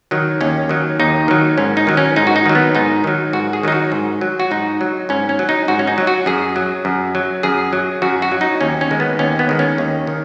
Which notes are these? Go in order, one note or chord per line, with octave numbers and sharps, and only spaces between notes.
D#3 F#3
D#2 C#4
D#3 F#3
D#2 D#4
D#3 F#3
G#2 C#4
D#4
D#3 F#3
C#4
G#2 D#4
F#4
D#4
D#3 F#3
B3
G#2 D#4
D#3 F#3
G#2 F#4
G#4
D#3 F#3 D#4
F#4
G#2
F#3
F#4
G#2 D#4
F#3
G#2 C#4
C#4
F#3
D#4
G#2 F#4
C#4
D#4
F#3
F#4
F#2 G#4
F#3
F#2
F#3
F#2 G#4
F#3
F#2 F#4
F#4
F#3
D#4
D#2 C#4
C#4
D#3 G#3
B3
D#2 C#4
B3
D#3 G#3
C#4
D#2
D#3